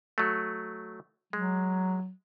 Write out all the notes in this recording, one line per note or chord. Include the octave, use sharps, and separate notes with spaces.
F#3 A3
F#3 G#3